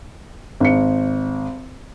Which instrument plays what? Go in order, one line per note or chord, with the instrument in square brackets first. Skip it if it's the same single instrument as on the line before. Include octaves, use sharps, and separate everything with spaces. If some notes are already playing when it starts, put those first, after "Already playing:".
[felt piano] G#1 C#7